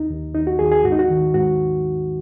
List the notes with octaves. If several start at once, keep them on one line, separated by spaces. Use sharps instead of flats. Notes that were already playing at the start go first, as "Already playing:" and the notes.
Already playing: D#2 D#4
D#2
D#2 D#4
F#4
D#2 G#4
G#4
G#2 F#4
D#4
F#4
D#3
G#2 F#4